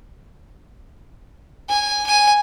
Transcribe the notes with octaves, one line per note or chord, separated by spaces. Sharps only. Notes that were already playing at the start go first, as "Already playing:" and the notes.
G#5
G#5